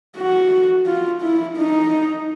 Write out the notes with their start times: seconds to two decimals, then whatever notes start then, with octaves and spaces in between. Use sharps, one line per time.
0.16 F#4
0.87 F4
1.22 E4
1.57 D#4